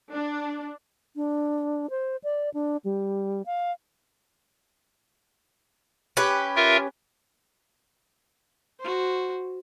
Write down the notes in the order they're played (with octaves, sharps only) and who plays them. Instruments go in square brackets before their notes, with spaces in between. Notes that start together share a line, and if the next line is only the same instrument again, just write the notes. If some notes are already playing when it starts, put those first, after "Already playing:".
[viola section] D4
[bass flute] D4
C5
D5
D4
G3
F5
[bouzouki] C#4 G4 B4
[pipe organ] F4 A#4 E5
[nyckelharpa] F#4 C5